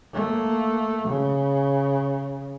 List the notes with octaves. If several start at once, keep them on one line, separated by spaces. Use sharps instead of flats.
A3 A#3
C#3